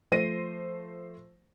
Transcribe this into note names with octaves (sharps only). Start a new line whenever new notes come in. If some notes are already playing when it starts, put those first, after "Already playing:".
F3 A3 C5 A#6 D#7